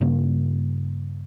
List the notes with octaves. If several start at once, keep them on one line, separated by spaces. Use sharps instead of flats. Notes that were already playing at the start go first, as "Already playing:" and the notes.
G2 C#3 A#3